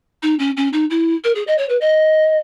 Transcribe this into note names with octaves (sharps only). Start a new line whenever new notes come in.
D#4
C#4
C#4
D#4
E4
A#4
G#4
D#5
C#5
B4
D#5